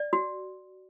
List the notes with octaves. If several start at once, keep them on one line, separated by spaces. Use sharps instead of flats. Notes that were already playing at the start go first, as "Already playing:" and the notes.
Already playing: D5
F#4